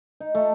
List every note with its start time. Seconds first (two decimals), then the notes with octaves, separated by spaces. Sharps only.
0.20 D#4
0.35 A3